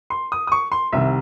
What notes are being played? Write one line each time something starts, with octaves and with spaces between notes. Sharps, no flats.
C6
D#6
D#6
C#6
C6
C2 C3 D#3 E5